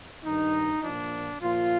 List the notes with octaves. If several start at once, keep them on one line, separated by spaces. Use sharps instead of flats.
G2 D#3 D#4
A#2 F3 D4
A#2 F3 F4